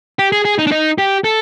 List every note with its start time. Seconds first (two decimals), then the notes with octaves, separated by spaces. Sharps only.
0.19 G4
0.32 G#4
0.45 G#4
0.58 D#4
0.67 D4
0.72 D#4
0.98 G4
1.24 A4